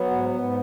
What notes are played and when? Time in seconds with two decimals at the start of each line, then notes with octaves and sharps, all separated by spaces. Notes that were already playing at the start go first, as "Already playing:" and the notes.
Already playing: F#3 B3
0.11 G#2
0.34 G#2